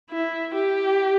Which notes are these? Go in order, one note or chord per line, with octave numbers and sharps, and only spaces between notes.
E4
G4